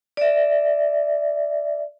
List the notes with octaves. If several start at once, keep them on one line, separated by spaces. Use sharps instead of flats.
D5 E5